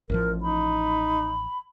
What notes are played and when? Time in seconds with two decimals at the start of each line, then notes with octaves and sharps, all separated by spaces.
0.10 A1 A2 F3 A#4
0.42 D#4 B5